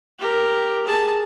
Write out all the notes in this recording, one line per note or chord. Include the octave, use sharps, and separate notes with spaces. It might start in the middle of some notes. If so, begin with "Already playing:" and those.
G4 A#4
G#4 A5